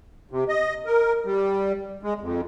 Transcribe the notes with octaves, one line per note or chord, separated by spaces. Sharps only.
C3
D#5
A#4
G3
G#3
F2